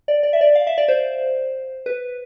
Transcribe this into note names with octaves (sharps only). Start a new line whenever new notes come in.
D5
D5
E5
D5
F5
E5
D5
C5
B4